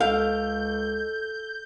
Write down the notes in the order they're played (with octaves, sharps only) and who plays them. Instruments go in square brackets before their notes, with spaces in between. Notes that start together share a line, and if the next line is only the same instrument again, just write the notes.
[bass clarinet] C#2 [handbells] A4 [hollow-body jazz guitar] F5 [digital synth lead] G6